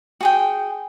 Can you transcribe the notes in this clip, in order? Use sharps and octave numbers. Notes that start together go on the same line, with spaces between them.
F#4 G#4 G5